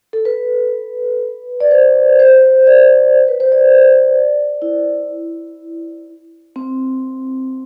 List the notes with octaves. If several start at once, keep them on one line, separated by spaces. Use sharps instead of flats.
A4
B4
D5
C5
C5
D5
B4
C5
D5
E4
C4